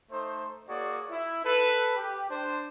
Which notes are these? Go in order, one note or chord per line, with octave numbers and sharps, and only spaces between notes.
A3 D#4 C5
A#3 F#4 G#4 C#5 D5
E4
A4 B4
G4
D4 C5